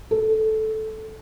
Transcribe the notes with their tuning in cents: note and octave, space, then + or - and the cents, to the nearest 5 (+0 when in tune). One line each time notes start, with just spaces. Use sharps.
A4 -10